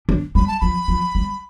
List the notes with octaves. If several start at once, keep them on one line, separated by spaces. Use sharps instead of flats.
D4
G3 B5
A5
F3 B5
F3
G3